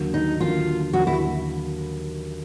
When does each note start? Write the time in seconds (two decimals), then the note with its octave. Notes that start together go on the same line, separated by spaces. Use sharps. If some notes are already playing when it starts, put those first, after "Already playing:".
Already playing: D#2 D3 F#3
0.14 D#4
0.40 D#2 D3 F#3 F4
0.93 D#2 D3 F#3 F#4
1.07 E4